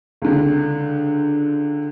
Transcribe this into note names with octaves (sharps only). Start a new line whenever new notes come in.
C#2 D3